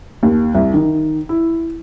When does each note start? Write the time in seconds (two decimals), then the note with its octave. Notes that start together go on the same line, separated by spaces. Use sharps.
0.23 D#2
0.55 C2
0.74 D#3
1.29 E4